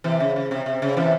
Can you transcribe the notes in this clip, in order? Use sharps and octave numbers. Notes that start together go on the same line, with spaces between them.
C3 E3
C#3
C#3
C3
C3
C#3
C3 E3